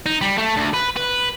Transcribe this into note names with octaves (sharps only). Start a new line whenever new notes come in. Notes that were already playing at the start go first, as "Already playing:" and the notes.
D#4
G3
A3
D2
B4
B4